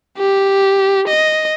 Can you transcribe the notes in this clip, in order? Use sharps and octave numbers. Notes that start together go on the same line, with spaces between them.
G4
D#5